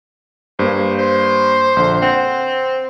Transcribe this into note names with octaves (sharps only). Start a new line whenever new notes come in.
G2 A#3 C5
C5
A#1 D3
C4 F#5